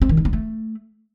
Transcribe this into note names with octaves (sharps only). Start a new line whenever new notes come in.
C4
D#3
D#4
B3
A3